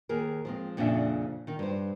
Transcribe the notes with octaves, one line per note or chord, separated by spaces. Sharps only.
D#2 G#4 A#4
F3 G#3 C4
F2 A#2 C#3 C#4 D4 E5
D#3 D#4
G2 C5